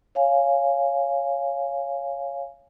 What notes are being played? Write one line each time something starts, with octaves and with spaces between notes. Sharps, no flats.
C#5 F5 G#5